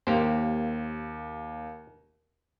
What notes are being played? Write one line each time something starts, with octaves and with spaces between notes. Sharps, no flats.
D#2 A#3 G4 C5